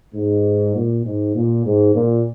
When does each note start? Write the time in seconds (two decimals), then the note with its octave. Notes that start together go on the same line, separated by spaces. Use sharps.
0.15 G#2
0.76 A#2
1.05 G#2
1.36 A#2
1.66 G#2
1.95 A#2